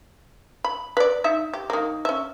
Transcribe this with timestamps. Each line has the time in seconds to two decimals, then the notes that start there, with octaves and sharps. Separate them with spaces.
0.64 B5
0.97 B4 D5
1.24 D#4 E5
1.54 G4
1.70 D#3 A#3
2.05 C#4 E5